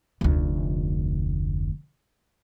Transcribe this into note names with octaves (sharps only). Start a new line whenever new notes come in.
F1 D2